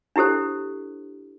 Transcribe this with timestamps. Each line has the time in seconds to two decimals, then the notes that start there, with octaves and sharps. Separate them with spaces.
0.16 D4 E4 G4 A4 C5